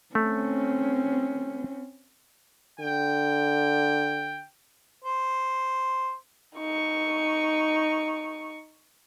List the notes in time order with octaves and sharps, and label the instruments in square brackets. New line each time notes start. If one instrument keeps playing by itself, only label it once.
[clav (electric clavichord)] A3 [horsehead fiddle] C4 C#4
[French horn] D3 [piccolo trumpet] G5
[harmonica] C5
[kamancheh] D#4 C#6